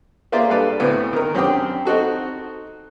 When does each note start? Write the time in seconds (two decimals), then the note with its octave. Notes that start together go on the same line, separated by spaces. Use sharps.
0.32 A#3 F4 G#4 C5 D5 E5
0.50 G2 A4 B4 D5 F5
0.80 D2 A2 B3 C4
1.13 D#3 A#4
1.35 F#2 C4 D4 G4 G5 D#6
1.85 C4 D#4 F#4 A4